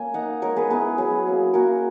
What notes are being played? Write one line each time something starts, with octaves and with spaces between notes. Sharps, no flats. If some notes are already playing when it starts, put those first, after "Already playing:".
Already playing: A#3 C#4 G#5
D#4 F#5 A#5
G#3 A#4 C#5
G#4 B4
B3 E4 G#4 B4
F#3 G#4
A#3 C#4 E4
A#3 F#4 A#4